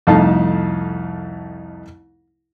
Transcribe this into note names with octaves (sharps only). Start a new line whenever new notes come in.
C2 F2 A3 D#4 F5 A5